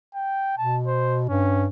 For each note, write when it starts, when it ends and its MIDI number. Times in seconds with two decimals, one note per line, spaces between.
0.15 0.57 79
0.58 1.26 47
0.58 0.77 81
0.87 1.21 72
1.29 1.67 43
1.29 1.67 61